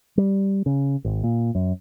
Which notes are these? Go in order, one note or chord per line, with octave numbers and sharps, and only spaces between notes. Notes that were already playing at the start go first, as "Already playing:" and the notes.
G3
C#3
G#1
A#2
F#2